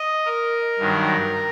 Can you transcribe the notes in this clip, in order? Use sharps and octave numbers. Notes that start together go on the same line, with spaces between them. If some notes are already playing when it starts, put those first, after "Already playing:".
Already playing: D#5
A#4
G2 D#3 F#3